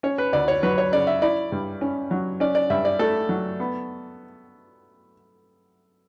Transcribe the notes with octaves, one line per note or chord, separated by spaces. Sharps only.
C#4 C#5
B4
D2 D5
C#5
F#3 B4
C#5
C#3 D5
E5
E4 D5
G2
C#4
F#3
C#4 D5
D5
G2 E5
D5
A3 A4
F#3
B3